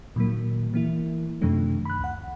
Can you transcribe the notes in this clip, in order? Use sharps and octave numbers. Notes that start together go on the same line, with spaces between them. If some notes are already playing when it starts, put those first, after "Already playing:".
A#2 D#3 F#3 A#3
E3 A#3 E4
F#2 C3 D#3 F3 A3 D4
B5 F#6
C#2 F#5